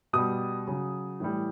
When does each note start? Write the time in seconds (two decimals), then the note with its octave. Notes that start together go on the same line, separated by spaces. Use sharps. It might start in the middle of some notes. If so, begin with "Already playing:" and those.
0.13 B2 G3 D#6
0.67 C#3 F#3
1.20 A2 E3 G3